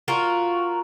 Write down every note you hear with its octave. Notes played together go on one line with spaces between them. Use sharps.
F4 F#4 A#4